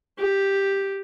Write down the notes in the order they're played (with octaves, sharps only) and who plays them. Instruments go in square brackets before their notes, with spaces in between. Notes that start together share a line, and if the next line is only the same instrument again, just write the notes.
[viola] G4